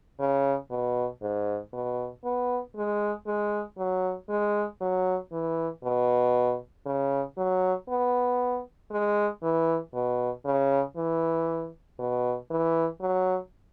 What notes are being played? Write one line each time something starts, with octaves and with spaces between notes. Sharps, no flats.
C#3
B2
G#2
B2
B3
G#3
G#3
F#3
G#3
F#3
E3
B2
C#3
F#3
B3
G#3
E3
B2
C#3
E3
B2
E3
F#3